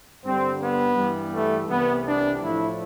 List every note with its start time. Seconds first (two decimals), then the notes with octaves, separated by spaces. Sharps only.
0.25 G2 D3 G3 C4
0.61 B3
0.97 G2 E3 G3
1.33 A3
1.69 C2 C3 E3 G3 B3
2.06 D4
2.41 A2 F3 A3 E4